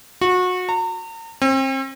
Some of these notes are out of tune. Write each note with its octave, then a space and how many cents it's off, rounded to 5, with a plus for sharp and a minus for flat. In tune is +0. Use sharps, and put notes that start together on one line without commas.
F#4 -25
A#5 -40
C4 +35